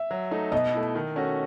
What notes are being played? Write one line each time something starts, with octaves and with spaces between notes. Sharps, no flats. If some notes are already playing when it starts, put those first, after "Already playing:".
Already playing: E5
F#3
A3 D#4
B2 D#5
A3 E4
D#3
A3 C#4 F#4